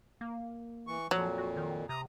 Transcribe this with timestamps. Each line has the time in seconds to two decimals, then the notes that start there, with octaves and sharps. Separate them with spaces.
0.21 A#3
0.87 E3 C#6
1.11 F2 A#2 F3 F#3
1.38 F#4
1.57 D#3
1.89 C3 A#5 D#6